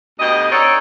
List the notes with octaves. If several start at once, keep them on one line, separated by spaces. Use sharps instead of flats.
D2 B2 G4 D#5
C4 D#4 F#4 A4 C#5 D5